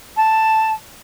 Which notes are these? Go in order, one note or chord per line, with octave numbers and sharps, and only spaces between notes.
A5